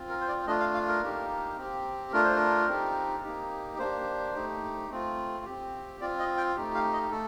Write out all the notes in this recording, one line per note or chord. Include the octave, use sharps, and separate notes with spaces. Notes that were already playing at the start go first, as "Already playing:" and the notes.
Already playing: C4 F4
A#4
C5
D5
A3 D4 F4 D#5
F5
F5
A#4
A#3 D#4 G4
C4 G4
A3 D4 F4 A#4
C5
A#4
C4 D#4 G4
A#3 D#4 G4
A#3 D4 G4 C5
A3 D#4 G4
A3 C4 F4
C4 G4
C4 F4 D5
D#5
G5
A3 D#4 G4
F5
D#5
A3 A4